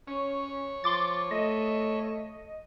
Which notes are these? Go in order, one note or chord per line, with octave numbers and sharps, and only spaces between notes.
C#4 C#5
F3 C6 D6 A6
A3 D#5